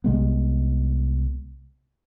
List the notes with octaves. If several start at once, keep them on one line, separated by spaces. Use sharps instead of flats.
C2 C3 G#3 B3